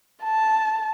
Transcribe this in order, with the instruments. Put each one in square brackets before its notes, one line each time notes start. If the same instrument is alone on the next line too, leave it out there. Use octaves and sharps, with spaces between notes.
[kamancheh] A5